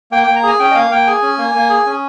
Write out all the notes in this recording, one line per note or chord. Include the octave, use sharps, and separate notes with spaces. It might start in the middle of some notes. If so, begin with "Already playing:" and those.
A#3 G5
A#3 G5
A#5
G#4 G#5
C#4 G5
D#5
A#3 F5
A#3 G5
G#4 G#5
C#4
A#3
A#3
G#4
C#4